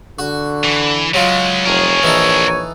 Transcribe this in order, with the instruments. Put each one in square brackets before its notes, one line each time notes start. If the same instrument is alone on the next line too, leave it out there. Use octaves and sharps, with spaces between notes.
[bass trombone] D3 [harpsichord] F#4
[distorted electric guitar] E3
[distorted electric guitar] C#3 G#3 [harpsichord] F#3 F4
[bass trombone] F1 [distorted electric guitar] G#4 A#4 [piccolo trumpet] C#5
[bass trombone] A#1 [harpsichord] E3 D#4 A4